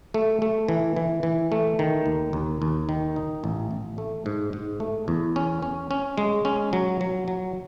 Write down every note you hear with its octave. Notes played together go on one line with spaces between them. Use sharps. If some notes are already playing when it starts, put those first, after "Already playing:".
A3
A3
E3
E3
E3
A3
D#3
D#2
D#2
D#2
D#3
D#4
A1
A1
A3
G#2
G#2
A3
E2
C#4
C#4
C#4
G#3
C#4
F#3
F#3
F#3